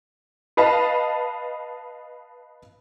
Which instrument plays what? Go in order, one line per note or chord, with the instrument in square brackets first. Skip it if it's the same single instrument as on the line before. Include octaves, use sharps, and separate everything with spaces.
[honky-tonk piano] B4 D#5 F5 A5 B5